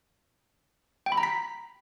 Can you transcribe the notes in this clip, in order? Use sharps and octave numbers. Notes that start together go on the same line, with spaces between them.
G5
B5
A#5
B6